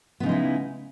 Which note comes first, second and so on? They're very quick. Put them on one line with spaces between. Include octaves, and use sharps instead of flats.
B3 C#3 D#4 G#3 E4